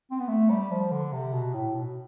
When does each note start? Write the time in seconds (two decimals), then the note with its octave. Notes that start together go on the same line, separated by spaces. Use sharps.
0.11 C4
0.20 B3
0.28 A3
0.50 G3
0.71 F3
0.92 D3
1.13 C3
1.33 B2
1.54 A2
1.75 B2